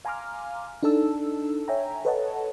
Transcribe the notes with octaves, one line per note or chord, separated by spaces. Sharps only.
F5 G#5 A#5 C6 D6 F6
D4 D#4 A4 A5 E6
C#5 E5 G5 G#5 A#5
A4 B4 C#5 D#5 F#5 A5